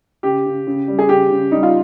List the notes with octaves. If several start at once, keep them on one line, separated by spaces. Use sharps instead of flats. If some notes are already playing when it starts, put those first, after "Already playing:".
C#3 G4
C#3
C#3
G3
G#4
C#3 G4
C#3
G3 D#4
F4